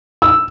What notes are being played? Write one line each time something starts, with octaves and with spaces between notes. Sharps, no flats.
E6